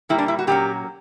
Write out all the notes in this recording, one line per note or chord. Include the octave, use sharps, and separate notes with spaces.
A#2 G3 A#3 E4
D4
E4
F#4
A#2 F#3 A#3 C#4 G4